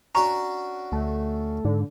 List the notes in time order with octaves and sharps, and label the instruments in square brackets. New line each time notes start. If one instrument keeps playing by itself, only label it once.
[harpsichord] C#4 D4 F#4 [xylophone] A#5 C#6
[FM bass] D2 [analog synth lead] A3
[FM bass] G#2 [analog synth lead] D3